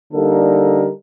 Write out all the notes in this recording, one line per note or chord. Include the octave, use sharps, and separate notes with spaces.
D3 G3 A#3 D#4 A4 A#4